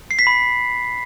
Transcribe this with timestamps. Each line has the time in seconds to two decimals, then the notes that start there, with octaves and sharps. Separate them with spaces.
0.11 C7
0.19 B6
0.27 B5